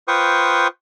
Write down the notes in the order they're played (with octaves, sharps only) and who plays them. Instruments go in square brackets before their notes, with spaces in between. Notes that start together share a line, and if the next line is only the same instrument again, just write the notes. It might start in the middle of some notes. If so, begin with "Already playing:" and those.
[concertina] F4 B4 C5 G5 C#6 D#6